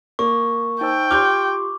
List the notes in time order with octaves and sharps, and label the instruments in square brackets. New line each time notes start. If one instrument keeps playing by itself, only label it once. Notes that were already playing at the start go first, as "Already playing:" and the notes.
[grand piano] A#3 [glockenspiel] C#6
[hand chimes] D#4 C5 E6 [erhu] G5
[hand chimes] F4 G4 C6 [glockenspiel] D6 [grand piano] F6 G6